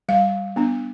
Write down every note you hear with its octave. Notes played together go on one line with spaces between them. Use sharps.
G3 F5
B3 D4